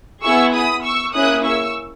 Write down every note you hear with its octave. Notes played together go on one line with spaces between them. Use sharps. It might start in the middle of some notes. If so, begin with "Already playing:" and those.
B3 E4 G#4 C#6 E6
B5 D#6
C#6 E6
A#3 C#4 E4 G#4 D#6 F#6
C#6 E6